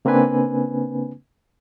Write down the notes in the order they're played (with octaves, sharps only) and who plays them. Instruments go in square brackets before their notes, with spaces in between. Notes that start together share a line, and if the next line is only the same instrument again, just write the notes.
[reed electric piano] C#3 A#3 C4 D4 B4 G#5